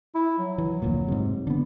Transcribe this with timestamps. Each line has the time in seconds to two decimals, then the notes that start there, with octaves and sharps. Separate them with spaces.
0.15 E4
0.39 F#3
0.58 E3
0.82 F1 D2 A#2
1.08 G#2 C3
1.47 D3 B3